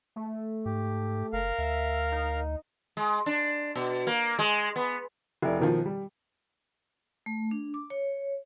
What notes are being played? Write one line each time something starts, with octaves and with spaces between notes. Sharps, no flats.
A3
G#2 G4
F#1 A#4 F5
D2 E5
D#4
G#3
D4
B2
A#3
G#3
B3
F1 E4 D5
B2 D#3 F3
G3
A3
D4
D6
C#5